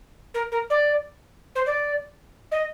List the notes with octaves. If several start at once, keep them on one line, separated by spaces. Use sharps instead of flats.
A#4
A#4
D5
C5
D5
D#5